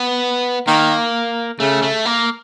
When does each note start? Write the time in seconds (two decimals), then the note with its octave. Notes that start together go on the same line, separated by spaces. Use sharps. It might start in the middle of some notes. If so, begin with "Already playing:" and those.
Already playing: B3
0.67 D#3 A#3
1.60 C#3 A3
1.82 A3
2.05 A#3